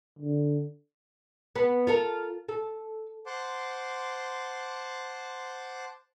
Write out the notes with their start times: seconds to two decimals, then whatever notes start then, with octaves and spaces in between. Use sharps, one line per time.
0.19 D3
1.56 B3
1.87 F4 A4 A#4
2.49 A4
3.26 C5 F#5 A5 C6 D6